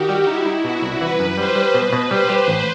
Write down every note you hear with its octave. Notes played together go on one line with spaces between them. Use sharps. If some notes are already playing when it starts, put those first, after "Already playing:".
Already playing: D#3 F#4 G4
G3
D#4 E4
D#4
B2 F#4
C2
E3 B4
F#2
G3 C5
G3
B2 B4
B2
G3 C5
G4
A1